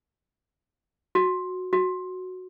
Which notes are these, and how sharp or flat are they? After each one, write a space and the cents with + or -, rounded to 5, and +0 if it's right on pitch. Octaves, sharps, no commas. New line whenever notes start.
F#4 -10
F#4 -5